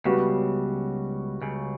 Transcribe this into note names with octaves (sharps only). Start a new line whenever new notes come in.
C#2 C#3 G3 B3 F#4
C#2 C#3